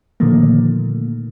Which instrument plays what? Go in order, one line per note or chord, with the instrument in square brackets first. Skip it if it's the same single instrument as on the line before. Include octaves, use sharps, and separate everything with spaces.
[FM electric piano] A#2 D3 D#3 F3 A3 A#3